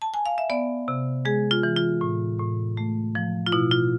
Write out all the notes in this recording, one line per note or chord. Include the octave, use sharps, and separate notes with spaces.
A5
G#5
F5
E5
B3 D5
C3
G#3 G#4
F4
E3
F4
A2
A2
A3
F3
F4
B2 E4
F4